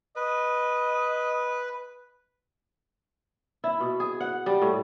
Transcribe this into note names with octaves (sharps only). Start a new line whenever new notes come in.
B4 D#5
E4
B2
G#4
F#5
G3
A2